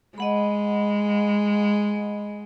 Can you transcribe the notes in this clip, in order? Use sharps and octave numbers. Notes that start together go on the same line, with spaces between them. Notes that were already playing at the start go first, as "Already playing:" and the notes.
G#3 D#5 F#5 B5